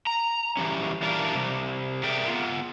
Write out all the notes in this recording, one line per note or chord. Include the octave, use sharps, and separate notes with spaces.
A#5
E3 G3 C#4
E3 G3 D4 F4 A#4 D5
C3 G3
G#4 A#4 D5 E5 G5
B3 F4